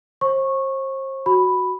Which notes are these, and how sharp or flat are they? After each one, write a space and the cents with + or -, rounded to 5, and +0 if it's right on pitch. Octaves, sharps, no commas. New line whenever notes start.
C5 +35 C#6 -15
F#4 +0 B5 +0